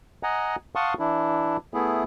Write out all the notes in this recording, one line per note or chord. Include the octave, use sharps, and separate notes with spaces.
D#5 F#5 G#5 A#5
F5 F#5 A5 C6 C#6 D#6
E3 D4 E4
A3 B3 E4 G#4